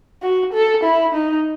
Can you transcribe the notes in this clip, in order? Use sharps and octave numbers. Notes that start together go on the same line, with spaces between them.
F#4
A4
E4
D#4